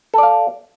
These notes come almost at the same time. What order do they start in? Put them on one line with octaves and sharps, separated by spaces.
A4 D5 F5